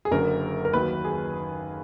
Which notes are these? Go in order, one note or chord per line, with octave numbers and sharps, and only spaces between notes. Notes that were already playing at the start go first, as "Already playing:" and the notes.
G#4
F#1 F#2 D3 A#4
A#4
D#2 D#3 F#3 B4
G#4